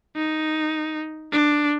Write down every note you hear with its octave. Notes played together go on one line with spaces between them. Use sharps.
D#4
D4